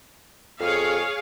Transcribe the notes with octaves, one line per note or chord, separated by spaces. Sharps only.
F2 G#4 C#5 F5